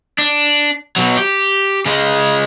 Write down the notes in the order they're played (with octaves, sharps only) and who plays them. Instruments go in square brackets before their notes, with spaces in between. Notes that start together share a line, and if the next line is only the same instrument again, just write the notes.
[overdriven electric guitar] D4
B2 F#3
G4
C#3 G#3